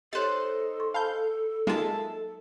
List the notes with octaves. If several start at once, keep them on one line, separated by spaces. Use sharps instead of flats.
D#4 G4 A4 C5 C#5 F#6 A6
C6 C#6
F5 G#5 A5 B5 G6
F#3 G#3 A#3 D#4 F4 F#4 E5 A5